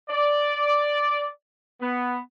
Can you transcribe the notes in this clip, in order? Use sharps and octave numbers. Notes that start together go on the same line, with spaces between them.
D5
B3